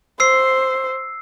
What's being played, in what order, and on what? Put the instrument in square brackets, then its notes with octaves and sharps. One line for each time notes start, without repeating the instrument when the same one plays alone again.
[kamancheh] C5 [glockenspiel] E6 C7